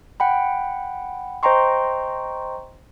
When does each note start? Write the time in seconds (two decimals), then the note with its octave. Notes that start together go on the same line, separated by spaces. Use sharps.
0.20 F#5 G5 B5
1.43 C5 D#5 G5 A#5 C6 C#6